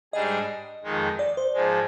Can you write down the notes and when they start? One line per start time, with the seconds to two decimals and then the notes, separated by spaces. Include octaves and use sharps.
0.13 G#2 G3 D4 G#4 D#5
0.84 F2 D#3 G#3 D#4
1.19 D5
1.37 C5
1.54 G#2 F3 G#3